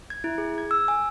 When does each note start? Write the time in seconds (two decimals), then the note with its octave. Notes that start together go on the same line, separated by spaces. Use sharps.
0.10 G#6
0.24 E4
0.38 G#4
0.58 G#6
0.71 E6
0.88 G#5